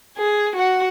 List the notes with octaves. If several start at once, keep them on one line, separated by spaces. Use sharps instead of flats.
G#4
F#4 F#5